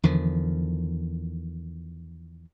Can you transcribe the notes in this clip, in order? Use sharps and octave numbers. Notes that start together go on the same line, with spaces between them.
E2 D3 D#3 F3